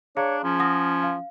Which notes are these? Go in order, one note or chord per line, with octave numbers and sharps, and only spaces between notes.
D4 G#4 C#5 F5 A#5
F3 C#4
F#5 D#6 A#6
F5